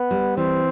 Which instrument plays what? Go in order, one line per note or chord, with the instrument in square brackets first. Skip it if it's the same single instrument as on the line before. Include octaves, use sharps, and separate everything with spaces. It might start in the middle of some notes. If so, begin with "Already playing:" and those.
Already playing: [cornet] B3
[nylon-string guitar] G3
[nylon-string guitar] E3 [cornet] C4